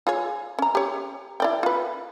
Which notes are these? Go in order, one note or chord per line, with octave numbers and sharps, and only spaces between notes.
F4 G#4 C#5
C#4 A#5
G4 C#5
E4 D5 G5
F4 B4